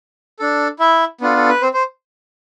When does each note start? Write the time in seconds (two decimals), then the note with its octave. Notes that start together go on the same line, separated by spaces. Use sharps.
0.39 D4 A4
0.79 E4 E5
1.21 B3 D4 F4 A4
1.37 A4
1.49 B4
1.62 C4 C5
1.74 C5